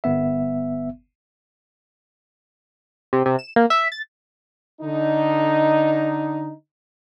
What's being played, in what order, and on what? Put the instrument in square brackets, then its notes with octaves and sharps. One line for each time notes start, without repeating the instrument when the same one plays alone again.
[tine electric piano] G1 B3 E5
[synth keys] C3
C3
E7
A#3
E5
A6
[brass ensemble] D3 D#4